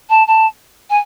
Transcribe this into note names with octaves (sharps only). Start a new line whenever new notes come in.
A5
A5
G#5